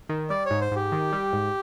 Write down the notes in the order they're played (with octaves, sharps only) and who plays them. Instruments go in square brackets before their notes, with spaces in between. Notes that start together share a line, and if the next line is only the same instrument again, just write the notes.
[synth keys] D#3
[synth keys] G3 [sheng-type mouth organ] D5
[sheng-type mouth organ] C#5
[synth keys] G#2
[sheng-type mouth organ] C5
[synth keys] G#2 [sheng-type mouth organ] G4
[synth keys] D#3
G3
G#2